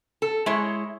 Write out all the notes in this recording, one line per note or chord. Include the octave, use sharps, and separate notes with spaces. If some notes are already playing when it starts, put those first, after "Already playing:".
A4
G#3 E4 C#5